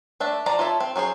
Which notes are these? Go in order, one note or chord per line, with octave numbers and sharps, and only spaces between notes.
A3 D4 E5
F3 D5 A#5
F4 A4 C#5 E5
C4
F#3 C#4 G#4 C5